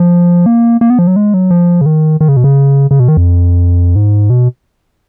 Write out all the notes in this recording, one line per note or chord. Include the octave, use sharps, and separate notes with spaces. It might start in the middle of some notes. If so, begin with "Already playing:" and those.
Already playing: F3
A#3
A#3
B3
F3
F#3
G#3
F#3
F3
C#3
D#3
D#3
C#3
B2
C#3
C#3
B2
D#3
F2
G#2
B2